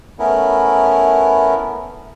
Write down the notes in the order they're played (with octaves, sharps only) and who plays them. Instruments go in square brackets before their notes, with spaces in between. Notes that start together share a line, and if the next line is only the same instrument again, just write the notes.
[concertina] A3 B3 C#4 E4 A#4